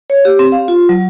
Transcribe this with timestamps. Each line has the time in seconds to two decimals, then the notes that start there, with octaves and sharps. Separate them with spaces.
0.10 C#5
0.25 G4
0.39 C4
0.52 F5
0.68 F4
0.89 F#3